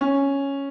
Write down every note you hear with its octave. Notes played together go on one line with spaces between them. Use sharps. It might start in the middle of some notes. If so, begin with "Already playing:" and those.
C#4